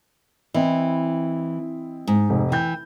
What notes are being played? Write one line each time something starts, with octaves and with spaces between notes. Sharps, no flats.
E3 C4 E4 D#5
G#2
F1
E3 G5 G6